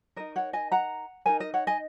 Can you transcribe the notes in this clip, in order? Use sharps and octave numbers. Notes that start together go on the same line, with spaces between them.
D#4 A#4 D#5
C#5 F#5
D#5 G#5
F#5 A#5
D#4 A#4 D#5 G#5
D#5
C#5 F#5
D#5 G#5